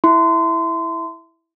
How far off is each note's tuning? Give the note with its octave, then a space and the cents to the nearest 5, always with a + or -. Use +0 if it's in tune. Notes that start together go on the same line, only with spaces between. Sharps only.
E4 +0 C6 -25